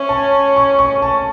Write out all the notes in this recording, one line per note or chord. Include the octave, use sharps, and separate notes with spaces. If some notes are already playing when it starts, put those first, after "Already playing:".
Already playing: C#4 E5
A5
C#6
C#6
A5